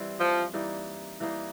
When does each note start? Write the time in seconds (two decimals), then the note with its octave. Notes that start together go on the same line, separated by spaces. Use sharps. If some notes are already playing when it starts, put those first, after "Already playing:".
Already playing: E3 G3 C4
0.20 F3
0.53 E3 G3 A#3 D#4
1.20 E3 G3 A#3 D#4